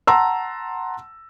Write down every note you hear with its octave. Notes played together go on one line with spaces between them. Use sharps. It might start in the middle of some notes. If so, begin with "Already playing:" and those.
F#5 A5 A#5 C6 E6